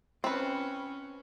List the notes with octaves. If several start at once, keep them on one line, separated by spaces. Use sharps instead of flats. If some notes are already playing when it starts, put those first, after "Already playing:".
C4 C#4 B4